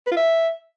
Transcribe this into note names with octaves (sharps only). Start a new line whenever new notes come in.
B4
F4
E5